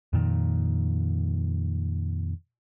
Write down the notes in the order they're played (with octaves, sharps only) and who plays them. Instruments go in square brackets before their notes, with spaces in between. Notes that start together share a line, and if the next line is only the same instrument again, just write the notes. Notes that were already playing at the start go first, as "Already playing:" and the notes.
[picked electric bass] F2 A#2 D#3